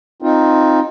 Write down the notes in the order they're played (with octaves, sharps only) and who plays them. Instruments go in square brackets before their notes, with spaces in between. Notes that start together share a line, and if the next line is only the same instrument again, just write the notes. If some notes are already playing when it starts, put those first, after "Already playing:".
[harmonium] C4 D#4 F4